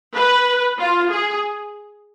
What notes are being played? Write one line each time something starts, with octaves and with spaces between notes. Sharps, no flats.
B4
F4
G#4